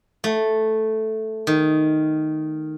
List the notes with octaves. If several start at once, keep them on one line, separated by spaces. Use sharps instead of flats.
A3
D#3